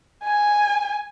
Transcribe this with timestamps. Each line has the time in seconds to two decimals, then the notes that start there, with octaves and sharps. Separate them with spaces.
0.24 G#5